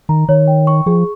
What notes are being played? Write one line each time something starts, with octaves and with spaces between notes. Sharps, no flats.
D#3 A#5
D#3 C#5
G5
C#6
F3 G#4